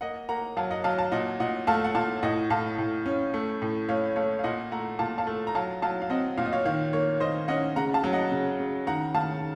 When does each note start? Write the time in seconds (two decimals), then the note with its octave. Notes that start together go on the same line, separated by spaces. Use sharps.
0.01 A#3 D#5 F#5
0.29 A#3 F#5 A#5
0.57 F#3 F5 A5
0.71 D#5 F#5
0.84 F#3 F5 A5
0.98 F5 A5
1.12 A#2 D#5 F#5
1.40 A#2 D#5 F#5
1.67 A3 F5 A5
1.84 F#5
1.95 A#2 F5 A5
2.22 A2 D#5 F#5
2.50 A2 F5 A5
2.78 A2
3.06 C#4
3.34 A3
3.62 A2
3.89 A3 C#5 F5
4.16 A3 C#5 F5
4.39 F5
4.44 A#2 D#5 F#5
4.71 A3 F#5 A#5
4.99 A#2 F5 A5
5.18 F5 A5
5.27 A3
5.47 A#5
5.55 F#3 F5 A5
5.82 F#3 F5 A5
6.02 F5
6.10 C4 D#5 F#5
6.37 A#2 F5
6.46 D#5
6.53 C#5 F5
6.65 D#3 C#5 F5
6.93 A#3 C#5
7.20 D#3 C5 D#5
7.48 C#4 D#5 F#5
7.76 C#3 F#5 A#5
7.94 F5 A5
8.04 F#3
8.13 D#5 F#5
8.32 C#3
8.59 C#3
8.87 D#3 F#5 A#5
9.14 D#3 F5 A5